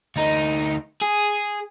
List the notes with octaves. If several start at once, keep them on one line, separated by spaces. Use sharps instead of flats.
D2 D#4
G#4